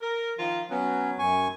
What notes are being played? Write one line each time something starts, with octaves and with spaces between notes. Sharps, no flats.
A#4
D#3 F3 F4
F#3 B3 C#4
F#2 G#5 C#6